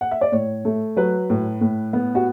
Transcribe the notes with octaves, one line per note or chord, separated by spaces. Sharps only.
F#5
E5
D5
A2 C#5
A3
F#3 B4
A2
A2
B3
F#4